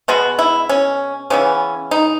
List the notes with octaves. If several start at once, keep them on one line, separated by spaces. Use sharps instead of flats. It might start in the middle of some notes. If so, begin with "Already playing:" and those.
B2 G#3 B3 F#4
E4
C#4
C#3 E3 B3 C#4
D#4